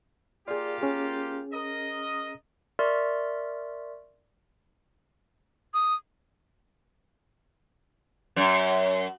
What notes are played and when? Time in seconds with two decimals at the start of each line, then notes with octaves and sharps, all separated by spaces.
0.48 A#3 F4 G4 G#4 D5
0.82 C#4 G#4
1.53 A#4 D#5
2.79 A#4 D5 E5 C6 C#6 F6
5.74 D#6
8.36 F#2